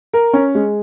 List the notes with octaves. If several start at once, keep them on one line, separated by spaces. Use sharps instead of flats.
A#4
C#4
G#3